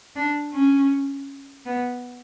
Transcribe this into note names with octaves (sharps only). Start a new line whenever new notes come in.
D4
C#4
B3